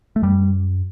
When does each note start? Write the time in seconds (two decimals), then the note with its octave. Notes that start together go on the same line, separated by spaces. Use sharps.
0.16 A3
0.22 F#2 G3